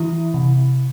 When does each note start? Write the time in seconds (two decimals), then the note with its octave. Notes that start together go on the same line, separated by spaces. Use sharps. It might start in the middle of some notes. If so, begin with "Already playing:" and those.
Already playing: E3 E4
0.34 C3